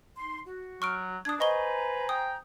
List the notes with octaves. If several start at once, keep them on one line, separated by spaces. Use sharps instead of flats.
D#4 C6
F#4
F#3 C#6 F6 D7
D4 D#6 G#6
B4 C5 D#5 G#5 A#5 C#6 G7
G5 D#6